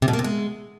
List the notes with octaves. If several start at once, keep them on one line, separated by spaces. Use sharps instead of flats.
C3
B2
A#3
C3
G#3